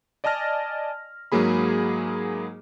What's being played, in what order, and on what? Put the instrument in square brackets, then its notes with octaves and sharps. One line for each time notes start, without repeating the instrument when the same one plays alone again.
[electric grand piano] D5 D#5 G#5 A5 F6 A#6
G#2 F#3 A#3 G#4 B5